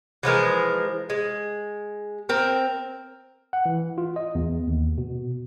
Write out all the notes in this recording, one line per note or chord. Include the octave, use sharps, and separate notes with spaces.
E3 F3 G#3 A#4
G#3
C4 A#4
F#5
E3
F4
D#5
E2
D#2
B2